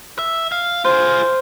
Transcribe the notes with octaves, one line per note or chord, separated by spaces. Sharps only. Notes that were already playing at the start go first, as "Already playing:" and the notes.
E5
F5
F4 G#4 C5